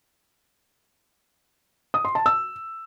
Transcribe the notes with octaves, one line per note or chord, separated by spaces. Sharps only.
D#6
C6
A5
E6